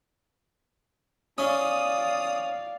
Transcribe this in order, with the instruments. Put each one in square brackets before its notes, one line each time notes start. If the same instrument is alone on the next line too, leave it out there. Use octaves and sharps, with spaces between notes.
[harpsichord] C#4 [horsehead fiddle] D5 F5 [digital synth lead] D#6